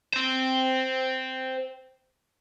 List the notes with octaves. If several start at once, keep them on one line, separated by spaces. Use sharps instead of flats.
C5 G5